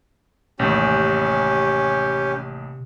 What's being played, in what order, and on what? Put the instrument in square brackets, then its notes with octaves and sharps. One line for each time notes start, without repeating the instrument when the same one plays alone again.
[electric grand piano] A1 D#2 [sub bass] C3 [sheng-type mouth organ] C#4 G4